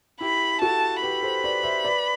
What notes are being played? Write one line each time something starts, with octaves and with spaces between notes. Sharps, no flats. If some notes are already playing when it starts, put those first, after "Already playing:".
E4 G4 B5
F#4 A4 A5
G4 B4 B5
A4 C5
B4 D5
C5 E5
B4 D5